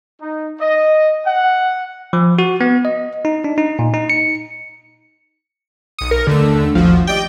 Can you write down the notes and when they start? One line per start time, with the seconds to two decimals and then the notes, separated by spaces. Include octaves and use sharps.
0.21 D#4
0.61 D#5
1.26 F#5
2.13 F3
2.39 F#4
2.61 B3
2.85 D#5
3.25 D#4
3.44 D4
3.58 D#4
3.79 A#2
3.94 D#4
4.10 C#7
5.99 B1 D#6 C#7
6.11 A#4
6.27 D#2 D3 A3 E6
6.75 A1 D#2 F3 F#4
7.07 G4 D5 D#5 G5